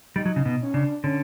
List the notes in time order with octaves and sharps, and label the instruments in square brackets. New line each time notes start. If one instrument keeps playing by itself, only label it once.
[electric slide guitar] G3 [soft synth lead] D#4
[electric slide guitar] F#3
C#3
B2
[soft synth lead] C#4
[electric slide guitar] C#3 [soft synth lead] D4
[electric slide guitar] D3 [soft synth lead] C#4